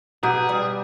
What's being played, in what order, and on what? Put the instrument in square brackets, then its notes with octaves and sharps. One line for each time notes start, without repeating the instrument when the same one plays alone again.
[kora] B2 [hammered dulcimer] G4 [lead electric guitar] G#4 [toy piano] F#5 G5 A#5
[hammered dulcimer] G3 [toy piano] G5